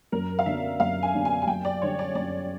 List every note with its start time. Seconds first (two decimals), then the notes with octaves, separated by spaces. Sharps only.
0.12 F#2 A#4
0.39 F5
0.46 D3 F#3 B3 D4 E5
0.80 F#2 F5
1.03 G#5
1.14 D3 F#3 B3 D4
1.25 G#5
1.42 G#5
1.47 F#2 G5
1.65 D5
1.82 D3 G3 C#5
1.99 D5
2.15 F#2 D5